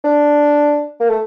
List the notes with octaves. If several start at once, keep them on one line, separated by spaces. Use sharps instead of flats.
D4
A#3
A3